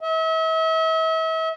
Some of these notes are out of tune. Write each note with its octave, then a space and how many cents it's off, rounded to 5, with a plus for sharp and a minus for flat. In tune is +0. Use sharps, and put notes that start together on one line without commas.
E5 -40